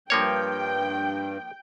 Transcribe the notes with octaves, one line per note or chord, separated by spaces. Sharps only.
G2 F3 A#3 C#5 G5